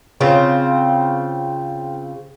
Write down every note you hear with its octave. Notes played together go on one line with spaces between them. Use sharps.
C#3 C4 F4